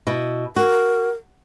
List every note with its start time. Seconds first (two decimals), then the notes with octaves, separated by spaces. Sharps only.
0.07 B2 E4
0.56 F#4 A#4